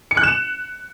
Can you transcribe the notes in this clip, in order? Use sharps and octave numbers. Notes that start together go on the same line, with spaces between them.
C#7
F#6
E7